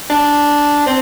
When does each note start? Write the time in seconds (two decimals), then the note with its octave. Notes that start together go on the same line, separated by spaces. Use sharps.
0.10 D4
0.86 C4